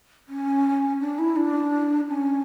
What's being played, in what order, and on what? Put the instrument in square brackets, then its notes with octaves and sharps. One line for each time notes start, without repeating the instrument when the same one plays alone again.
[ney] C#4
D4
E4
D4
C#4